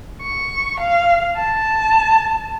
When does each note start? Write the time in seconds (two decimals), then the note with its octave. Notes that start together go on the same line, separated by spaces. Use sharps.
0.22 C#6
0.80 F5
1.37 A5